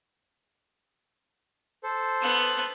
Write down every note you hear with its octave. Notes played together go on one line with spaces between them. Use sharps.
A4 C5
B3 F#6